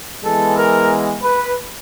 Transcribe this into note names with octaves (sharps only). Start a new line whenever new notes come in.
E3 G#3 B3 A4
A#4
B4